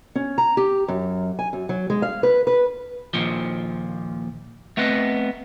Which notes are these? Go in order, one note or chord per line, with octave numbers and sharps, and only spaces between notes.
C#4
A#5
G4
F#2
G#5
F#2
F#3
G#3
F5
B4
B4
D#2 A#2 F3
A3 B3 C4 B4 D#5